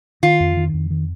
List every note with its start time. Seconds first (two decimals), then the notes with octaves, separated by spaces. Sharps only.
0.23 D#3 F4
0.40 F2
0.57 D#3
0.74 F2
0.91 D#3